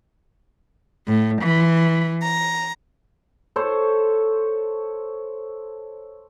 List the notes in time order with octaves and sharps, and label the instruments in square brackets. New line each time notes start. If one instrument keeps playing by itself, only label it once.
[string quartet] A2
E3
A#5
[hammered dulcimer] A4 C5 C#5